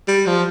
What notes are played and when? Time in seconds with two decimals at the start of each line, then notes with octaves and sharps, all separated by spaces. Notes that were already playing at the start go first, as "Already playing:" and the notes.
0.08 G3
0.26 F3